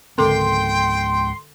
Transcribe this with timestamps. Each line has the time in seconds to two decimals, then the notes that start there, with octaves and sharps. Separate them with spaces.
0.18 C#2 G#2 D3 C4 A4 G5 C6 D6